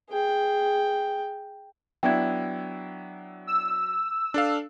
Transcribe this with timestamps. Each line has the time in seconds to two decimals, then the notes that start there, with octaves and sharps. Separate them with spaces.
0.10 G#4 G5
2.03 F#3 B3 D4 E4 G5 G#6
3.47 E6
4.34 D4 A4 F5